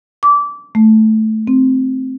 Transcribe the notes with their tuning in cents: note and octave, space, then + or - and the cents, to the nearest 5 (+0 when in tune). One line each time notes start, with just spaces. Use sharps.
D6 -20
A3 -10
C4 +0